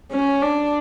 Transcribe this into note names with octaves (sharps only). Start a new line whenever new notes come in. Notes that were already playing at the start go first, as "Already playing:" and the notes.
C#4
D4